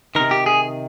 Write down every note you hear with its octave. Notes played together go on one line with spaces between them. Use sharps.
C3 D#3 A#4
G4
G#4